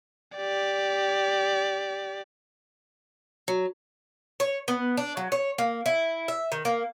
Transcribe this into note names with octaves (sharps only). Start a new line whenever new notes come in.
G4 D5
F#3
C#5
B3
D4
F#3
C#5
A#3
E4
E5
D#3
A#3